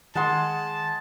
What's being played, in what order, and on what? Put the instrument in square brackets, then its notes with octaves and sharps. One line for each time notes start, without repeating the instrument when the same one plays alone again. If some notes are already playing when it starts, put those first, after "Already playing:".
[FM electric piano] D#3 [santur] G#3 F#5 C6 [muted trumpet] A5